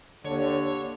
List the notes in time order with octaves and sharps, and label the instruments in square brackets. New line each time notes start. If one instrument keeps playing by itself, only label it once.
[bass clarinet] D#2 [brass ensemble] D3 [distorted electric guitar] C#5